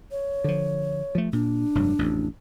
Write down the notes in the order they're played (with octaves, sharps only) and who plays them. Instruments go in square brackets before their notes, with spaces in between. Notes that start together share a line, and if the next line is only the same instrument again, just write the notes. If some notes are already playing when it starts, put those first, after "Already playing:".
[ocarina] C#5
[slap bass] D3 F3
F3 A3
[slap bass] A#2 [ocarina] D4
[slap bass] F1 G2 F#3
A1 F2